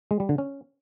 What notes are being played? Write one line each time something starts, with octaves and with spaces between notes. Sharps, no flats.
G#3
G3
D3
C#4